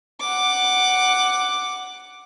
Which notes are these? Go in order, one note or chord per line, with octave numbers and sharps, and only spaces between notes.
F#5 D6